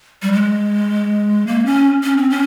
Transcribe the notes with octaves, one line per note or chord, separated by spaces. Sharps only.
G3
G#3
A#3
C#4
C#4
C4
C#4